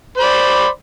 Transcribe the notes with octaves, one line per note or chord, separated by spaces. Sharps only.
C5 D5 B5